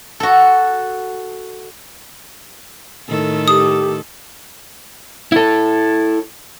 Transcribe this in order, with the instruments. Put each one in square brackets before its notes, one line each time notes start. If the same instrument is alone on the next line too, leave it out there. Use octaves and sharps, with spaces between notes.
[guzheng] F#4 A4
[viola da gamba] A2 D#3 A4
[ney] G4 [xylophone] D#6
[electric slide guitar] E4 A4